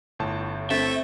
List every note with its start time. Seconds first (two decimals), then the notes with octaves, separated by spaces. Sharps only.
0.19 G1 A2 A5
0.70 A3 C4 E5